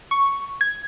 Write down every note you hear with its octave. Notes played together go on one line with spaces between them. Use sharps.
C#6
G#6